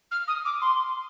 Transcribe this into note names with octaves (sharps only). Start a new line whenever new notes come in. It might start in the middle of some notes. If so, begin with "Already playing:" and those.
F6
D#6
D6
C6